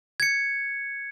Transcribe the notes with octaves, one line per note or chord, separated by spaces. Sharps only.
G#6 C#7